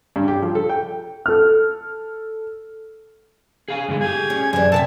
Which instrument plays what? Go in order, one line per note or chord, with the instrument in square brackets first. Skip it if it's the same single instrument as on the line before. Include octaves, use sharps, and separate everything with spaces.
[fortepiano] G2
G4
F3
A4
G5
[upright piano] A4 F6
[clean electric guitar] G#4 F5 G#5
G2 D3 G#3
[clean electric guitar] G4 G#4 [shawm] G#5
[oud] C#4
[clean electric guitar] F#2 [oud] D3 E3 [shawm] G#5
[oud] C3 A#4 E5 [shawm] A5